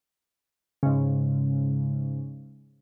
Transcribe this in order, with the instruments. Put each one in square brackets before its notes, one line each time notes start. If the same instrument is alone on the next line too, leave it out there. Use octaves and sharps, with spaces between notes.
[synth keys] G#2 C#3